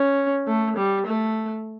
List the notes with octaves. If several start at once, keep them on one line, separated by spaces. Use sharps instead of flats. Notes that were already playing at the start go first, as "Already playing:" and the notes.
Already playing: C#4
A3
G3
A3